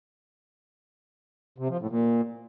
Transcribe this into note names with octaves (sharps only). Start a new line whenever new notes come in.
C3
F3
A2
A#2